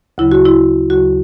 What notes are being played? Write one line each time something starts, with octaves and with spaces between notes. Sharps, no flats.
D2 C#3 F#3 E4
F#4
E4
D2 C#3 F#3 F#4